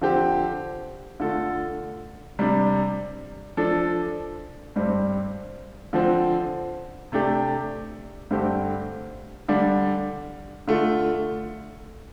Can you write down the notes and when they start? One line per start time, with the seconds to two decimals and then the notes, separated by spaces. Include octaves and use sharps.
0.02 D3 F3 C4 G4
1.20 D3 A3 F4 A4
2.39 C3 G3 D4
3.57 F3 D4 A4
4.76 G2 G3 C4
5.93 D3 F3 C4
7.12 C3 A3 D4 G4
8.31 G2 D3 A3 C4 G4
9.49 D3 G3 D4
10.68 D3 A3 F4